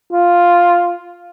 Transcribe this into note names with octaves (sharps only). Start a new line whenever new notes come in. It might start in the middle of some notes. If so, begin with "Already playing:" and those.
F4